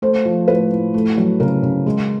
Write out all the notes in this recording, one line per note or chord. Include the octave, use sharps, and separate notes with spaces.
A3 C5
F3
A2 B4
A2
A3
F#3
C#3 A#4
C#3
G#3